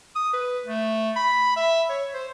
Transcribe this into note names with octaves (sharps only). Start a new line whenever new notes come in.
D#6
B4
A3
B5
E5
C#5
C5